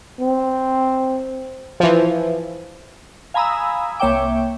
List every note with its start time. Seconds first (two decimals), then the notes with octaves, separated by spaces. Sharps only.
0.20 C4
1.80 E3 F3
3.34 F5 G#5 A#5 B5 D#6 E6
3.99 C2 A#3 C#5 E5 G5 D6